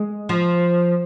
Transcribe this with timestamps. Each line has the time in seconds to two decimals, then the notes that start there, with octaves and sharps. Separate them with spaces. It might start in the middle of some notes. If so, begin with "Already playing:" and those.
Already playing: G#3
0.29 F3